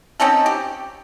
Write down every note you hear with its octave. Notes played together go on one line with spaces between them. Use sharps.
C4 C#4 D#4 A4
G4